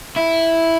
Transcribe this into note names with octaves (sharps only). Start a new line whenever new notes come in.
E4